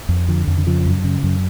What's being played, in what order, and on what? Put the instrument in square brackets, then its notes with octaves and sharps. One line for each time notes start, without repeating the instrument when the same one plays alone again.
[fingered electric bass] F2
D3 F3
F2
D3
C#3 F3
F#2
C#3
F#2